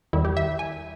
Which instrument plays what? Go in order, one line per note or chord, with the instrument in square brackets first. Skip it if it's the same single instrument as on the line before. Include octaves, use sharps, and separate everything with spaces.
[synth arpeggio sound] E2 D#3 G3 E4
G4
E5
G#5